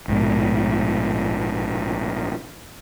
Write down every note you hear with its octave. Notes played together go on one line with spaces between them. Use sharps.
A#1 G#2 B2